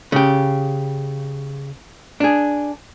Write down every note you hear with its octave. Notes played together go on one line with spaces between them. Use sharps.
C#3 G4
D4 G#4